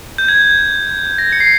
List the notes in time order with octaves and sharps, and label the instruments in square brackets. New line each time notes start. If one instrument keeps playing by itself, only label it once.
[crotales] G6
G#6
A#6
C#7
C7